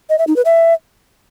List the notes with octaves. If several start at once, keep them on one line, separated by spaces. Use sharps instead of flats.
D#5
E5
D#4
B4
E5